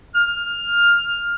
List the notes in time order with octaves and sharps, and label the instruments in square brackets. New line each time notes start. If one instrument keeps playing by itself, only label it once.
[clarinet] F6